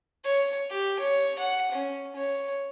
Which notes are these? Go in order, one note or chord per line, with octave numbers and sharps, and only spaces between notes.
C#5
G4
C#5
F#5
C#4
C#5